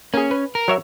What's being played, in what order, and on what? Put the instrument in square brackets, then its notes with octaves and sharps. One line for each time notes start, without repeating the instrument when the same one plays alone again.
[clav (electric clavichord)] A#3 G#4 [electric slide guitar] C#4
[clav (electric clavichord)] B4
[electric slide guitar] A#4
[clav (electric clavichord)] F#3 C#5 E5